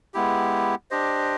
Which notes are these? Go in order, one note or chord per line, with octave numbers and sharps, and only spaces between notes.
G#3 B3 E4 G4
D4 G4 C5 D#5